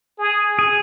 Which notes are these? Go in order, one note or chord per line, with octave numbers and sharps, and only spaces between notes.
G#4
G#4